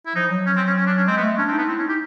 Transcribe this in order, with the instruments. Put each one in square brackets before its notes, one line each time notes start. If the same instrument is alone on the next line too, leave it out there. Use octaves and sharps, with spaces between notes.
[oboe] E4
[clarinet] F3 [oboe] D#4
[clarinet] F#3
[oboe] C#4
C4
C#4
C#4
D4
C#4
[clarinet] G#3 [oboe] C4
[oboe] B3
[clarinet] A3
[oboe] C#4 [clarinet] D4
[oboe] C4
[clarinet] D#4
[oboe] B3
[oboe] C4 [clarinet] E4
[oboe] C#4
[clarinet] D#4
[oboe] G4